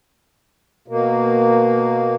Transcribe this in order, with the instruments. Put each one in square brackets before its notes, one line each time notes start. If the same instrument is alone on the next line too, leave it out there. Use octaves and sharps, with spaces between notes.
[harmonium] B2 A#3